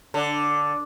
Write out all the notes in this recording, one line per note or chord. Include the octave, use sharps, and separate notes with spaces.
D3